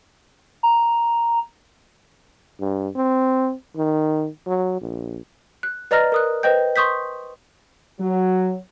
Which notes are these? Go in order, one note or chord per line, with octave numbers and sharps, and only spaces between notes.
A#5
G2
C4
D#3
F#3
A#1
F#6
B4 D5 D#5 A#5 F6 A#6
A#4 D#6 F#6
B4 C5 D#5 G5 G6
C6 C#6 D#6 G6 B6
F#3